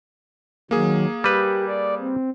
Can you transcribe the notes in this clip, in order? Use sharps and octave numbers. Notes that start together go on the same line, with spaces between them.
D#3 F#3 A#3 G#4
G3 G4 B4
D5
C4